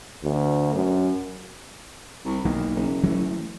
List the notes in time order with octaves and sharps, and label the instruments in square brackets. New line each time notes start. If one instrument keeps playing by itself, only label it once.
[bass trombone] D2
F#2
[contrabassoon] C2
[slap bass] B1 E3 A#3 [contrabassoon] D#3
[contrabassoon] F#1
[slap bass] E3 F#3 A3